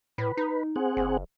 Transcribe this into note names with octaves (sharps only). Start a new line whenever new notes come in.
A2 B4
D#4
C4 G#4 F#5
F#1